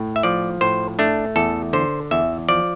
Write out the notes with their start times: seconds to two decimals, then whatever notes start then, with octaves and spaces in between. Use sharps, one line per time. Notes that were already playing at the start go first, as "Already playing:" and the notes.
Already playing: A2
0.16 E5
0.23 F3 D5
0.61 A2 C5
0.99 A3 D4
1.36 E2 A4
1.73 D3 C5
2.11 E2 E5
2.49 F3 D5